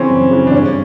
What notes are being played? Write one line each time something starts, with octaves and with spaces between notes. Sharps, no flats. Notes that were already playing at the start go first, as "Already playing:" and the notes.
Already playing: C#3 E3 C4 C#4
F#2
C#3 E3
D4
G2 C#4